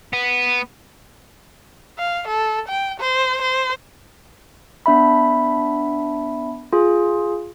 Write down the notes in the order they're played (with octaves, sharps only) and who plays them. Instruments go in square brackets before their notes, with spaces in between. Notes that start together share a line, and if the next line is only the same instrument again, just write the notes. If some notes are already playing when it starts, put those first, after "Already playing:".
[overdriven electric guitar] B3
[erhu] F5
A4
G5
C5
C5
[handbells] B3 D4 E5 B5
F4 G#4